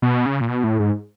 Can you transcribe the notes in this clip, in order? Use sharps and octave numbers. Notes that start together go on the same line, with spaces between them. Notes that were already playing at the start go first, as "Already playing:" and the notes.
B2
C#3
A#2
B2
A2
G#2